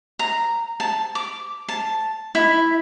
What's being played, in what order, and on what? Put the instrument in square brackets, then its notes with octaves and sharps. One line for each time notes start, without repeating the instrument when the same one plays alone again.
[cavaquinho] A#5
A5
D6
A5
E4